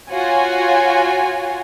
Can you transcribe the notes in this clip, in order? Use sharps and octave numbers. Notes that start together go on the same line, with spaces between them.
F4 F#4 C#5 G#5